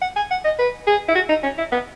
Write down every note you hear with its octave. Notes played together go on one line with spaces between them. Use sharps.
F#5
G#5
F#5
D#5
B4
G#4
E4
F#4
D#4
C#4
E4
B3